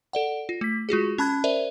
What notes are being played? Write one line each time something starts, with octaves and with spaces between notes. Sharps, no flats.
A4 D5 F#5
F4
A3 B6
G#3 F4 F#4 G#4
C#4 A5 B5 F#6 G#6
A#4 C5 D5 E5